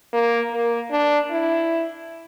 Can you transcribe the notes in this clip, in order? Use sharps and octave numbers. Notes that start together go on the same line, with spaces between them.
A#3
A#3
D4
E4